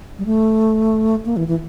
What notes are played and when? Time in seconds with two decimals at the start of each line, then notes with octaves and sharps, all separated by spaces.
0.18 G3
0.26 A3
1.25 A#3
1.37 E3
1.48 E3